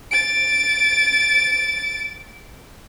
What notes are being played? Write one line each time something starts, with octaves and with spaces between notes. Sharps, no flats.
A6 D7